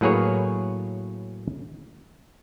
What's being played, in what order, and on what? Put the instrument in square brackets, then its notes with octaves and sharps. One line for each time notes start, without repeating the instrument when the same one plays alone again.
[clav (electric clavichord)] A2 F#3 A#3 G#4 B4 C#5